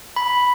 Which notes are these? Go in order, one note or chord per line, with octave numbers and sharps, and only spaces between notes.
B5